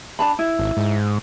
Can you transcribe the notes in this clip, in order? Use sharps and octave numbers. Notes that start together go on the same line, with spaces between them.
D4 A5 B5
E4
G#1
G#2